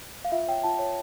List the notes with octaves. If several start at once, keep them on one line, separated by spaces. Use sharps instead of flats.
F5
F4 E5
C#5 G5
F4 A5
C#5